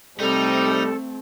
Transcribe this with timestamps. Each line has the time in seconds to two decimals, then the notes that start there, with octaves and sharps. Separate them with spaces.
0.20 C3 G3 A3 C4 D#4 A4